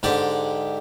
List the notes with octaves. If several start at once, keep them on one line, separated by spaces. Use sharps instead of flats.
G#2 D3 G4 D5